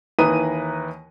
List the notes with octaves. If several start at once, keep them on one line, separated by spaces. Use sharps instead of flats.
D#2 E3 B4 A#5 D#6 D#7